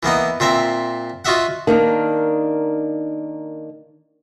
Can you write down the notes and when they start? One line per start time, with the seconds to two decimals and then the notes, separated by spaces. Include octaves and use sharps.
0.03 E3 A#3 B3 D#4
0.40 A#2 C4 E5 A#5
1.25 F4 F#4 D#5 E5 F#5
1.67 D#3 A#3 D4